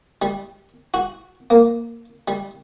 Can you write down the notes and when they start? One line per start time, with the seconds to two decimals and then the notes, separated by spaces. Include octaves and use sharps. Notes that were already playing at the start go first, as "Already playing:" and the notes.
0.22 G3
0.94 F#4
1.50 A#3
2.28 G3